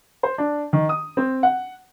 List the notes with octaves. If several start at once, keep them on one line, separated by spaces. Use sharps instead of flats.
C5
D4
D#3
D#6
C4
F#5